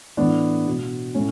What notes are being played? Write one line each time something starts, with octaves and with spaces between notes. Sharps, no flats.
A2 E3 B3 D4
B2
A2 C#4